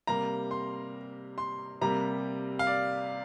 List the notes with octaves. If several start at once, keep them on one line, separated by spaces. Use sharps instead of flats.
C3 G3 A#3 A#5
C6
C6
C3 G3 A#3 A#5
F5
D5